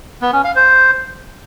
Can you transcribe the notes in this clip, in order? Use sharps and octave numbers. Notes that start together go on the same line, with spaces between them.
B3
C#4
F5
C5